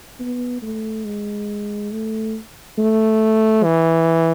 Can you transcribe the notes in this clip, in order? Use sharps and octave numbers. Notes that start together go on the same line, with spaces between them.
B3
A3
G#3
A3
A3
E3